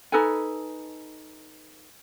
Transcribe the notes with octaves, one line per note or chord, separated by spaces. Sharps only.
D#4 A4 B4 G#5